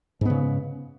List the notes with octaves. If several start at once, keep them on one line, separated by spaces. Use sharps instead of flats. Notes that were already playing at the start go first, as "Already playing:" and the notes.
G#2 C#3 B3